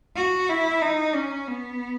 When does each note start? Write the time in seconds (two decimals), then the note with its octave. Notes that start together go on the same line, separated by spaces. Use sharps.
0.16 F#4
0.49 E4
0.81 D#4
1.14 C#4
1.47 B3